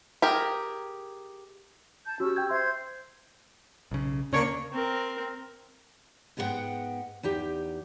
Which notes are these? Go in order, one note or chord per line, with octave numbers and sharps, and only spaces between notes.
G4 G#4 A#4
A5 G6
C#4 F#4 G4 E6
G5 G6 G#6
C5 E5 C6 G#6
B1 C#3
D2 C#3 A#3 D4 C#5
C4 A#4
G#2 G#3 B3 B4 F#5 G5
E2 D#4 G4